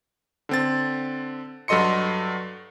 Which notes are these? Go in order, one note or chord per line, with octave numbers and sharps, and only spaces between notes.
D3 C4 A6
G2 F#3 A4 D#5 C6 C#7